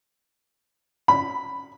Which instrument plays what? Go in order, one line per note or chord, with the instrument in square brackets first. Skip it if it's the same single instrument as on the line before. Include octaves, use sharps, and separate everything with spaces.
[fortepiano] B5